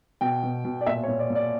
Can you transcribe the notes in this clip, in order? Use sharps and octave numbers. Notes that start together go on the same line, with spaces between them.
B2 G5
B2
B2
D5
A#2 E5
C#5
A#2
D5
A#2
D5